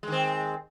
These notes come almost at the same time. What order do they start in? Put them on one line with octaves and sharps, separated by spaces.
G#3 D#3 C4